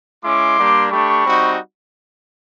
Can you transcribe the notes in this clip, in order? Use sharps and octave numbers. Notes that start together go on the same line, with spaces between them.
G#3 C#4 E4 C6 D6
G3 A#3 D4 G4
A3 D4 G4 B5 C#6
G3 C4 D#4 F#4